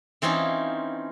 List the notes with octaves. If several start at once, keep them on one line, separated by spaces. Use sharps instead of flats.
E3 C4 C#4 D#4 F4